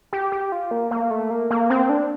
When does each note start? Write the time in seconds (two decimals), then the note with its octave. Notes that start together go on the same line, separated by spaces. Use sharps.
0.13 G4
0.32 G4
0.52 F4
0.71 A#3
0.91 A#3
1.11 A3
1.30 A#3
1.50 A#3
1.70 C4
1.89 D4